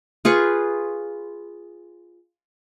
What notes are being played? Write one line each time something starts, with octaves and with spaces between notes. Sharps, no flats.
F4 G#4 B4 C#6